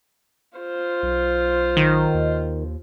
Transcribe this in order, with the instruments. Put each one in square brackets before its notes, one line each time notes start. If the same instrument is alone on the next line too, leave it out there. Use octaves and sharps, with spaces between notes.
[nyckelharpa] F4 C5
[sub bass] B1
[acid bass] D#3
[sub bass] D#2